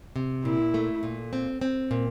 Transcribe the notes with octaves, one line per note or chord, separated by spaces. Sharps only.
C3
A#2 E4
A3
A#2
C4
C4
A#2